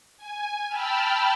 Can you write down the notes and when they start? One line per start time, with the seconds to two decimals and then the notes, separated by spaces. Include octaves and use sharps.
0.17 G#5
0.68 G5 A5 B5 E6 F6